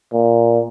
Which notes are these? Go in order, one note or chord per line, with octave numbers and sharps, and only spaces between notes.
A#2